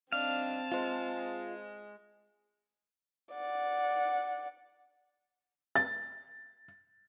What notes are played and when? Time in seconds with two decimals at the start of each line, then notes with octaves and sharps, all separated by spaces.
0.12 G3 C4 D4 D#4 F5 A5
0.72 G#3 F4 C5
3.34 D5 F#5
5.76 A6